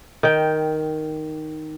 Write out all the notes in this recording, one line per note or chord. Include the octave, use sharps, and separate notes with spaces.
D#3 G5